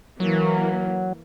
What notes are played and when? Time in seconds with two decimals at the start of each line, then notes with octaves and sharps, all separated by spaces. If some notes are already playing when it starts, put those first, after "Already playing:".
0.20 E3 F#3 A#3